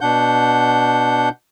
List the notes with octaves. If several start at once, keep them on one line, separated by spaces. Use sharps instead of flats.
B2 D4 F#5 G6